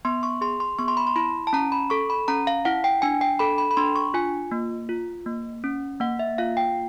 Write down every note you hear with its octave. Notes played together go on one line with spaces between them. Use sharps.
B3 C6
C#6
G#4 C6
C6
B3 C#6
C6
B5
C6
E4 B5
A5
C#4 A#5
B5
A4 C#6
B5
C#4 A#5
F5
E4 F#5
G5
D4 G#5
G5
A4 B5
B5
B5
D4 C6
C#6
F4 G#5
A#3
F4
A#3
C#4
A#3 F#5
E5
F4 F5
G5